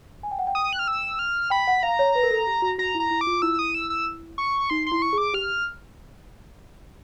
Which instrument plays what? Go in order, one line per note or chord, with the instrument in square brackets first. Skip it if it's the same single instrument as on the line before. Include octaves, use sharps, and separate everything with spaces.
[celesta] G#5
G5
F#5
G5
[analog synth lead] D#6
F#6
F6
E6
F6
[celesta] G5 [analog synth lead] B5
[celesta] F#5
[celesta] F5 [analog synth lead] A#5
[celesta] C#5
B4
A#4
A4
G4
F#4
[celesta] F#4 [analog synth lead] A#5
[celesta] E4
[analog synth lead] A#5
[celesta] E4
[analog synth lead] D6
[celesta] F4
F4
[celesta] E4 [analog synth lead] E6
[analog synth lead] D#6
E6
E6
C#6
[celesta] D#4 [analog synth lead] C6
[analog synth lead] C6
[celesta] E4
[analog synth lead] C#6
[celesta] G#4
[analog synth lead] D6
[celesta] G4 [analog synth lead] F6